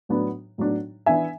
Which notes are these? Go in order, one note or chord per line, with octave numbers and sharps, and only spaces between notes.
A2 F#3 B3 D4
A2 F#3 B3 D4
E3 B3 D4 E5 G#5